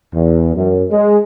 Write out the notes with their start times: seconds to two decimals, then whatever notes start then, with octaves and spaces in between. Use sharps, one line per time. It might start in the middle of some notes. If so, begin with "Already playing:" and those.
0.14 E2
0.56 F#2
0.91 G#3